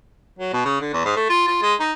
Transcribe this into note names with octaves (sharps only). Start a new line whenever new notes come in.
F#3
B2
C#3
D3
E2
G#2
A3
F4
F4
G#3
D#4